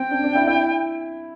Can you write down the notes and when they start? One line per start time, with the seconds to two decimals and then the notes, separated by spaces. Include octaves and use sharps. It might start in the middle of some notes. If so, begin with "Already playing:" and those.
Already playing: C4 G5
0.11 D4
0.24 D4
0.35 E4
0.48 E4